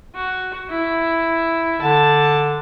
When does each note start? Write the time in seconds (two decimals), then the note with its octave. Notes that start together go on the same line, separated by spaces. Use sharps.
0.15 F#4
0.70 E4
1.81 D3 A5